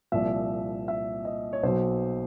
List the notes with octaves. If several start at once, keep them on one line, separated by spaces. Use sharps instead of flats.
C2 A#2 F3 E5
E5
D#5
C#5
B1 B2 F#3 C5